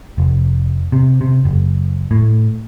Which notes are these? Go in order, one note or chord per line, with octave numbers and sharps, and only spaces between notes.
F1
C3
C3
F#1
A2